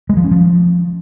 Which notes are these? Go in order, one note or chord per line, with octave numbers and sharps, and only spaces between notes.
G#3
F3
C#4
F3